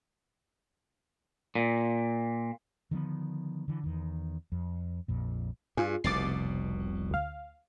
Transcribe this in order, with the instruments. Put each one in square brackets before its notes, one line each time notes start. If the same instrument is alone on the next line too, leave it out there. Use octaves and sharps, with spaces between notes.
[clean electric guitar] A#2
[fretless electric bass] D3 D#3 F3 B3
D3 E3
E2 D#3
F2
A#1 F2 A#2
[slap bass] G2 [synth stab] F4 G#4
[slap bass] F1 C2 B2 [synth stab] D6 A6 C7
[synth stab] D2 F5